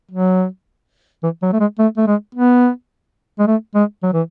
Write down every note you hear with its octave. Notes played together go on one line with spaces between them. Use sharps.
F#3
E3
F#3
A3
G#3
A3
A3
G#3
B3
G#3
A3
G#3
F#3
E3